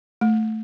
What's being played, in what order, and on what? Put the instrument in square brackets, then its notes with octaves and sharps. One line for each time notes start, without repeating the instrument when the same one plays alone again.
[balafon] A3